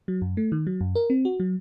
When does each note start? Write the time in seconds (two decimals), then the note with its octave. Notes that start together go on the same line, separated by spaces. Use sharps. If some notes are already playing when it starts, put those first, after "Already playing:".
0.08 F#3
0.22 F#2
0.37 A3
0.52 D#3
0.67 F#3
0.81 F#2
0.95 A#4
1.10 C4
1.25 F#4
1.40 F#3